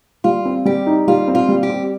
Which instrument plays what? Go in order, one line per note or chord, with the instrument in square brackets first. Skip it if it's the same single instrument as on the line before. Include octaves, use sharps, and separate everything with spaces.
[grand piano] G3 [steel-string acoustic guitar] F4
[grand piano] C4
[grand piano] G3 [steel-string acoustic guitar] G4
[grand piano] D#4
[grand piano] G3 [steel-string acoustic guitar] F4
[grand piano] C4
[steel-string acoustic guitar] F4
[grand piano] G3
[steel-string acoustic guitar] G4
[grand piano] C4